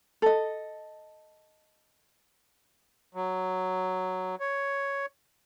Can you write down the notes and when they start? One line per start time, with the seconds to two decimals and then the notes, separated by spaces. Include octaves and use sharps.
0.22 A4 D#5
3.15 F#3
4.40 C#5